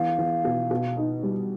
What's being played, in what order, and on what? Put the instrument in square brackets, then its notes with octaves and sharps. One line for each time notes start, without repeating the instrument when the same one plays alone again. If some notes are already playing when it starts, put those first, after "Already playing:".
Already playing: [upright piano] E2 [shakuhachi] F5
[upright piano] E2
B2
B2
D#4
G3